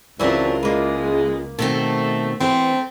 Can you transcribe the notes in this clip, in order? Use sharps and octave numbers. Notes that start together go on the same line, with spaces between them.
C#2 E3 F#3 C4 D4 E4 F4 A#4
G#3 A#3 B4
B2 D#3 A3 C4 A4
E3 A3 C4 D4 F#4 C5